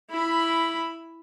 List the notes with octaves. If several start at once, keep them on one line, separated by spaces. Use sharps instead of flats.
E4 B5